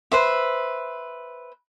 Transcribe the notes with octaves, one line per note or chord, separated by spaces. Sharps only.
B4 C5 E5